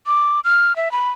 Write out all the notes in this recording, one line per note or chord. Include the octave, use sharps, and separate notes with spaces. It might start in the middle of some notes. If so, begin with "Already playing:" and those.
D6
F6
E5
B5